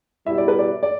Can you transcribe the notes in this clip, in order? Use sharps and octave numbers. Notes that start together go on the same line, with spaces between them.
B2 G3 E4 E5
D5
B4
D5
D5